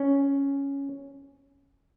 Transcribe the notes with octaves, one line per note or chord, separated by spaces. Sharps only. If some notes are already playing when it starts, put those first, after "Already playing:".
Already playing: C#4